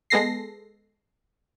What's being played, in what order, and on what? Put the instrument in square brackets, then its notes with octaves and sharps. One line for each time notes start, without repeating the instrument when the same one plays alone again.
[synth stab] G#3 B3 A4 A#6 C7